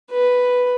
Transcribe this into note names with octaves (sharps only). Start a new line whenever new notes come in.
B4